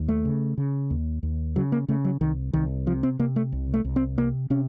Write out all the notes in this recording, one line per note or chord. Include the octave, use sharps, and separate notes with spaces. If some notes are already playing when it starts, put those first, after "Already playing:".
Already playing: D#2
A3
C#3
C#3
D#2
D#2
C#3 F#3
A#3
C#3 A3
F#3
C2 D#3
C2 D#3
C3 F3
C4
C3 A#3
A3
C2
A3
C2
C4
C3 A#3
C3 C#4